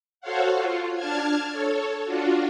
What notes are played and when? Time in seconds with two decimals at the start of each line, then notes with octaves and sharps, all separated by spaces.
0.20 F#4 A4 C5 C#5 F5 F#5
0.55 F4
0.95 D4 A5 F6 G#6
1.52 A4 C#5
2.04 D4 F4 F#4